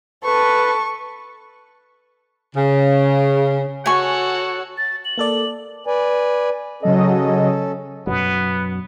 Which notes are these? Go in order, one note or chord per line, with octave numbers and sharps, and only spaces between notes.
A4 B4 A5 C#6
C#3
F#4 A4 C#5 F#5 G#5 C#6
A6
F#7
A#3 A4 D5
B4 D5 G#5
C#3 F#3 C#4 A4 D#5
F#2 B2 F#3 B3